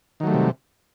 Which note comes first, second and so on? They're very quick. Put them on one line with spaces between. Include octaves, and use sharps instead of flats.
D#3 F#3 A3 G3 C3